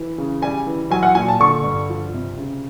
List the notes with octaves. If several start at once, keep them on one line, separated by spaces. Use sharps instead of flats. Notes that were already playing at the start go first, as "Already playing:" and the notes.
Already playing: E3
C#3
G3 G#5
E3
F#3 G#5
F#5
A#2 G#5
A5
D3 C#6
G2
F3
C3
C#3